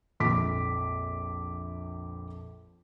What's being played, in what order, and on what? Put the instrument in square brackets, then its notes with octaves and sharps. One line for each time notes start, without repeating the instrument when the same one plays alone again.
[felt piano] A#1 F2 D6 B6